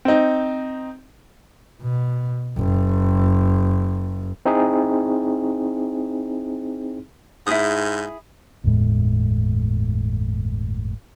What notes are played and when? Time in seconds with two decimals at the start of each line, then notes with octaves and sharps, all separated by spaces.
0.05 C4 D#4
1.82 B2
2.57 F#1
4.46 C4 D#4 E4 G#4
7.47 G#2 E4 G#4 D#6
8.64 G1 E2 A2 G#3